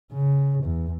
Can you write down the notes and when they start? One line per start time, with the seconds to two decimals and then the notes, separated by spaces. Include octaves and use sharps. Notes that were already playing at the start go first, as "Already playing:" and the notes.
0.13 C#3
0.65 E2